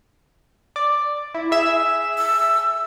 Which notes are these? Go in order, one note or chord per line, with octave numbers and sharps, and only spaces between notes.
D5
E4
G#4 E5 E7
E6